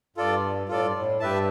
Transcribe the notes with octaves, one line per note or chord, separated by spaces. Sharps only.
G2 F4 A4 D5
A2 F4 A4 D5
G2
A2
G2 G4 B4 E5 A5